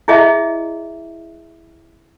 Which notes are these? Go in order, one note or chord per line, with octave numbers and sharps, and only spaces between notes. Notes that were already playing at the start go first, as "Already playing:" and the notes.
E4 G#4 D#5 E5